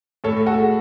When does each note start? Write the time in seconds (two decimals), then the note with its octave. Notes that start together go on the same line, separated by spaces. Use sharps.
0.24 A2 A4 C#5
0.46 F#4 A4
0.58 G#3